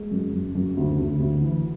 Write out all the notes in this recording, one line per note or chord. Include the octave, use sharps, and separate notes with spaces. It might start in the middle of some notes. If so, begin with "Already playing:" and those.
Already playing: G#3
F#2
F#2
F#2
D2
D2
D2
E3